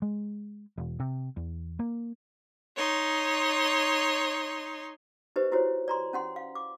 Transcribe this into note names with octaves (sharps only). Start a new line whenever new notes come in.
G#3
E1
C3
E2
A#3
D#4 C#5 C6
D#4 G4 B4 C5 D#5
E4 F#4 C5 C#5
D5 A#5 C6
C#4 F#5 C6
F5
D6